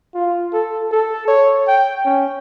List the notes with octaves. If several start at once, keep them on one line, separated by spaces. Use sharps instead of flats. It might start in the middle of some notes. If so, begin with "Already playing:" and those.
F4
A4
A4
C#5
G5
C#4